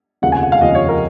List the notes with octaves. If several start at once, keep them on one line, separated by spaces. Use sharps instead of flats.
F1 D#2 C#3 F3 F#5
G#5
F#5
F5
F1 D#2 C#3 F3 D#5
C#5
A#4